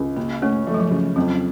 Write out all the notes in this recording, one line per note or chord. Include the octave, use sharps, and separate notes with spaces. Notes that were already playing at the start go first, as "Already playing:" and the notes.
Already playing: C#2
C#3 A#3
A3 C#4
F3 A3
F#3
F3
C#3
F2 F#3